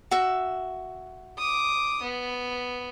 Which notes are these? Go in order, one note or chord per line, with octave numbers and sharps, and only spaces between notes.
F#4 E5
D6 D#6
B3